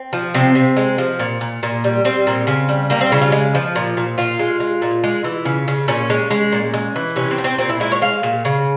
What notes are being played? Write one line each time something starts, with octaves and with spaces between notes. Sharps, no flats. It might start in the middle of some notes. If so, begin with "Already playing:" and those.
Already playing: C4
F3
C3 C4
C3
G#3
F3
A#2
A#2
A#2
G3
G3 C4
A#2
C#3
G3
G3 A#3
C4
C#3 E4
F4
G#3
F3
A#2
A#2
A#2 F4
G#3
G#3
A#2
G#3
E3
C#3
C#3
A#2 C#4
G#3
G#3
A#2
G#3
E3
C3 C#4
C4
C3
C4
A#2 C4
E4
G#3 E4
C#5
G#3 F5
A#2
C#3